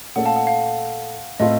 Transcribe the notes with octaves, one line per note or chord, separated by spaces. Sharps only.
A#2 A3 C#4 A4 F#5
F5 A5
F#5
F5
A2 A3 C4 F4 A4 D#5